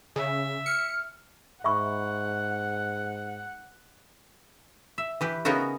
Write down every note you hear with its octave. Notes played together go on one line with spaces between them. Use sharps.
C#3 E5
F6 C#7
G#2 E5 F#5 B5 C#6
E5
E3 G4 B4
C#3 B3 C#4 D#4 F#4 A#4